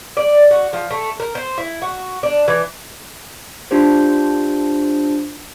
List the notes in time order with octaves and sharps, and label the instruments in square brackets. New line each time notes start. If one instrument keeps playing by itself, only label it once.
[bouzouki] D5
F#4
F3
A3
A#4
C5
E4
F#4
D4
E3
[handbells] D4 F4 G4 C5